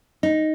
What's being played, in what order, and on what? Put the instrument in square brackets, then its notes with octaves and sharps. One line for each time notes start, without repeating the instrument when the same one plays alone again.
[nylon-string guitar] D#4